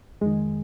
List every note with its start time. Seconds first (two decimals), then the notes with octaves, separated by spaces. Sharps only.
0.21 F2 D#3 G#3